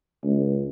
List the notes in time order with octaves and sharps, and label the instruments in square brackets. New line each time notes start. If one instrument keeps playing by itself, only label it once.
[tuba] C#2